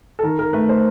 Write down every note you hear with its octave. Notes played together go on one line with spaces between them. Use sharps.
A4
D#3 A#4
A#4
A3 B4
C5